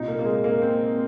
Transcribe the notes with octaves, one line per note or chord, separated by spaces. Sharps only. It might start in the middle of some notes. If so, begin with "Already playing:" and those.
Already playing: C2 A#2 D#4
A#3
A#3
G#3
A#3
C4